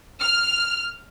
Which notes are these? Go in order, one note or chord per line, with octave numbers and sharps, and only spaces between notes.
F6